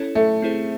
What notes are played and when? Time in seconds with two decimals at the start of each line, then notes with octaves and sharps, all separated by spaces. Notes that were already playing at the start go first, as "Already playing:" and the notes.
Already playing: C#4 E4 A4 C#5
0.15 A3
0.42 C4 E4 G#4 C5